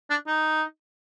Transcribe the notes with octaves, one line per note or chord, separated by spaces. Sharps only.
D4
D#4